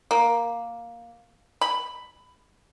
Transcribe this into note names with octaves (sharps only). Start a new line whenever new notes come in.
A#3
B5